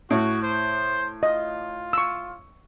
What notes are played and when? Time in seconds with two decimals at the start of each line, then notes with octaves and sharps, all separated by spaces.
0.11 A2 F#4
0.43 C5
1.23 F4 D#5
1.93 C#6 E6